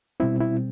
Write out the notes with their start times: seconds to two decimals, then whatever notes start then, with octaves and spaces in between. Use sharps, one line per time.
0.20 B2 G3 C4 E4
0.41 E4